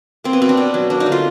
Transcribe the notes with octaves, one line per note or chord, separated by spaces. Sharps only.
A#3 C4
B3
B2 C4
D4
B2
F#3
A#3 D4
D#4
D3
F4